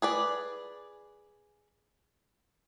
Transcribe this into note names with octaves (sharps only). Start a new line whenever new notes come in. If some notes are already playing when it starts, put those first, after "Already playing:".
G#4 B4 D5